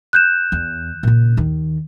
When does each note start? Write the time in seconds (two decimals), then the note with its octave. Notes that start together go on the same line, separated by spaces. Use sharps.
0.13 F#6 G6 E7
0.52 E2
1.03 A#2 C#3
1.37 D#2 D#3